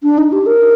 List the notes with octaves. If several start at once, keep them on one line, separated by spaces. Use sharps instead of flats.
D4
D#4
G4
A#4